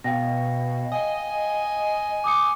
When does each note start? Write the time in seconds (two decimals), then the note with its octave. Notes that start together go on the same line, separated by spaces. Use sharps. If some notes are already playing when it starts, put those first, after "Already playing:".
0.04 B2 F5 G5 A#6
0.92 D#5 G#5
2.24 D6 D#6 C#7